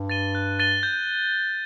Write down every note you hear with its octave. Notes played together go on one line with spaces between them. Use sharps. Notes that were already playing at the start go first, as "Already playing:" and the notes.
Already playing: G2
A6 D#7 G7
F#6
A6 D#7 G7
G6